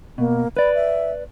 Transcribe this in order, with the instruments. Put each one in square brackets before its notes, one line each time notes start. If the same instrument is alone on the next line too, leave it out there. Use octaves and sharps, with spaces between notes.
[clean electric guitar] B2 [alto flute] A#3
[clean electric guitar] B4 D5 [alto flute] B5
[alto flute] E5